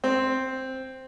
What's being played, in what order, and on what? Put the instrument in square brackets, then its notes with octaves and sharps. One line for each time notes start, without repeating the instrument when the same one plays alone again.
[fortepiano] C4